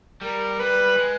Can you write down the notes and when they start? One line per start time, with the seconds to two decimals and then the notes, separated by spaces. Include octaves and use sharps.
0.21 G3 A#4
0.59 G3 B4
0.98 G#3